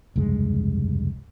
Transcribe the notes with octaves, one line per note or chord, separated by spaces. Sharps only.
F1 C#2 G2 G#3